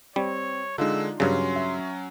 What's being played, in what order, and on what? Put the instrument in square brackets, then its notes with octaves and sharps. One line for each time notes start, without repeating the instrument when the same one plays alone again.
[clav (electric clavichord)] G3 [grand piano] C4 [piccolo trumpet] C#5
[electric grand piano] D3 G#3 [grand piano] D4 D#4 F4 [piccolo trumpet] E6
[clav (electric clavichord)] G2 C#3 [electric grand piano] F#3 C#4 [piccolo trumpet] C6
[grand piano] E5